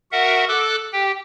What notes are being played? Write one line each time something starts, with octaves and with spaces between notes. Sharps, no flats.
F#4 A#4 E5 F#5
A4 D6 F#6
G4 G5